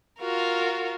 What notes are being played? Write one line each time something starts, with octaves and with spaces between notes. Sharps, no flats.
F4 F#4 A#4